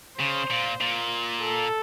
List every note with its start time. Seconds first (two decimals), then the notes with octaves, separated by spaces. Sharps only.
0.19 C#3 C5
0.50 A#2
0.81 A#2
1.42 A4